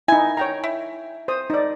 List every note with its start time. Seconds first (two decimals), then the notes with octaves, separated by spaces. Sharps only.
0.08 D#4 E4 G#5
0.37 C#5 G5 A#5
0.64 E4
1.28 C5 D#6
1.50 D#4 D5